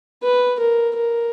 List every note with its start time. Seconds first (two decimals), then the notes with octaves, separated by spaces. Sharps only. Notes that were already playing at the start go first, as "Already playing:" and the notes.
0.23 B4
0.59 A#4
0.96 A#4